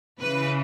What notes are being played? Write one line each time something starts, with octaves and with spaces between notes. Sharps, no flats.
C#3 E3 B4